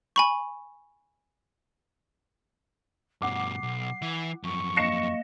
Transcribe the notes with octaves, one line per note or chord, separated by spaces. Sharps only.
G#5 B5 C#6
G2 B2 F#5 D6 C7
B1
E3
F#2 F3 C#6
A#3 D#5 A#6 C#7 E7